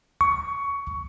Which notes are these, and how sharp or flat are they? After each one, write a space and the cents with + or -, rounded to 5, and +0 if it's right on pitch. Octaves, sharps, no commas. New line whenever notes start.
C#6 +15